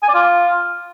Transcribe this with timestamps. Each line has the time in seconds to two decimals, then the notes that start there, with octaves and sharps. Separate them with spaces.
0.03 G#5
0.09 D5
0.14 F4